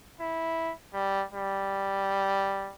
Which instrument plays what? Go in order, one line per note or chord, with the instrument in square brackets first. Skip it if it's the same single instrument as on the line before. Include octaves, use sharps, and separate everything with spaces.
[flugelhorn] E4
G3
G3